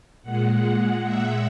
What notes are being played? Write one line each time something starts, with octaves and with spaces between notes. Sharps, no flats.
A#2 G#3 F#5
F#5
E5